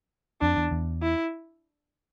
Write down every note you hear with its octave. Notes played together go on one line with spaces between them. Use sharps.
F2 D4
E2
E2
E4